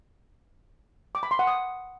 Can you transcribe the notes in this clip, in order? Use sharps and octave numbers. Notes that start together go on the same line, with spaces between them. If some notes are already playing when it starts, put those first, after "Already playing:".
D6
B5
C6
F#5
D#6